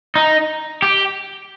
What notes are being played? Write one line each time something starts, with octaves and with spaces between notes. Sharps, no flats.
D#4
G4